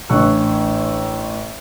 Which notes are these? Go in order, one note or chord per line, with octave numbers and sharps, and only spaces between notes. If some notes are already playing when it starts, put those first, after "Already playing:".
A1 D4 C#6 E6 F#6